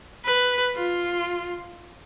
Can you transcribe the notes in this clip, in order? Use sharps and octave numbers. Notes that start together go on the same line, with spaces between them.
B4
F4